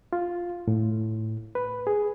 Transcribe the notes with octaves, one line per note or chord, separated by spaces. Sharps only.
F4
A2
B4
G#4